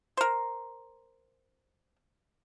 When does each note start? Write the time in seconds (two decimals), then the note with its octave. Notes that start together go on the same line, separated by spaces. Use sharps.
0.17 A#4 C5